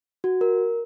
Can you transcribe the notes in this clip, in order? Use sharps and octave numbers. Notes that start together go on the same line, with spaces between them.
F#4
A#4